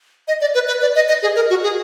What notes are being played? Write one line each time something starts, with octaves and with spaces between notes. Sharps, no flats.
D#5
D5
B4
B4
D5
D#5
D#5
G#4
A#4
F#4
G#4